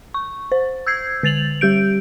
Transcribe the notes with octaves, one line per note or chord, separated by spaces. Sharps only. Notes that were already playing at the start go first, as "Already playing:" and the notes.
C#6
C5
E6 G6 G#6 C7
D3 A6 F7 F#7
G3 G4 G6 D7